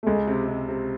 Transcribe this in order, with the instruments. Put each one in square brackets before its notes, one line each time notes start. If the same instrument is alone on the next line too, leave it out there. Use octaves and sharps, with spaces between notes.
[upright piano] A3
[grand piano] C#2 [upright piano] G#3
[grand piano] C3
C3
C3